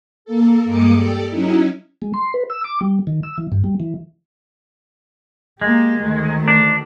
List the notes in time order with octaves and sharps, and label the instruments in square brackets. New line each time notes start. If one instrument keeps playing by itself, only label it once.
[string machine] A#3 A4
G2 G#3 A#3 D6 D#6 C#7
G4 A4 D5
F#3 C#4 D#4 E4
[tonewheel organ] G#3
C6
B4
E6
D6
G3
D#3
E6
E3
G2
G3
E3
[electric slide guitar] G#3 [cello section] A#3 G4
[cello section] D2 D#3 A3
[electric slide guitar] D4